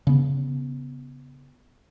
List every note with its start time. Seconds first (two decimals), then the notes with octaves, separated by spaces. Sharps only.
0.07 C#3 B3